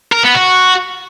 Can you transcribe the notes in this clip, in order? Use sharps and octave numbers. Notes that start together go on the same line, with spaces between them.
A#4
B3
F#4